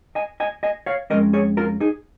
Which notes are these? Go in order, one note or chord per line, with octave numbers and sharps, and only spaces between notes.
D#5 G#5
D#5 G#5
D#5 G#5
C#5 F5
F2 F3 G#3 C#4 A#4 D#5
G#4 C#5
F4 A#4
D#4 G#4